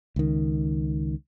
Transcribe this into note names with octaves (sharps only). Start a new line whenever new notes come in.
C#2 D#3